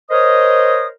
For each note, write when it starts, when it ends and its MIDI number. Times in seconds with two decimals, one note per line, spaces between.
0.10 0.87 70
0.10 0.87 72
0.10 0.87 73
0.10 0.87 75
0.10 0.87 87